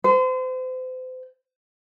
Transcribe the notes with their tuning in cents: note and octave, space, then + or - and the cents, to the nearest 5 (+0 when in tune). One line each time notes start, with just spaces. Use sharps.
C5 -35